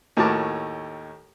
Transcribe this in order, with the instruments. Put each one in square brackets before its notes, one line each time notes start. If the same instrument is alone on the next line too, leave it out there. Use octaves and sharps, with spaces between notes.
[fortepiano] D#2 A2 F#4 A#4 A5 D6